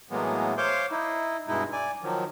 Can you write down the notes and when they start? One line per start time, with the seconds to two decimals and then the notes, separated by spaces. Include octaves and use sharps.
0.10 A2 E3 F#3 G#3 A#3 B3
0.58 C5 C#5 F5 C6 D6 G6
0.91 D#4 E4
1.47 G2 B2 G#3 D#4 E4
1.72 D5 G#5
2.02 D#3 F3 F#3